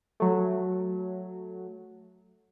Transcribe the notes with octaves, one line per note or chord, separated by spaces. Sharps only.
F#3 A3